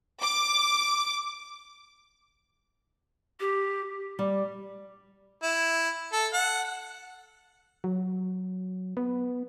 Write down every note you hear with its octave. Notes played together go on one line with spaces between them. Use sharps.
D6
G4
G3
E4
A4
F#5
F#3
B3